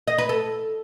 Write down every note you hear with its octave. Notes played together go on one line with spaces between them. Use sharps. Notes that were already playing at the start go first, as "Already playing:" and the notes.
D#5
B4
A4